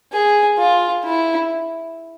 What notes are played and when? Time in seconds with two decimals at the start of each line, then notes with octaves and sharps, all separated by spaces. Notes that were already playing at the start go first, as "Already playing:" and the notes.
0.13 G#4
0.59 F4
1.04 E4